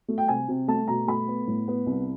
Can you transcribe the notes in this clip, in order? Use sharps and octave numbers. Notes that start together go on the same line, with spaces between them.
A3
G5
C3 G#5
C3
A3 A5
B2 A#5
A3 B5
B3
A2
B3
C2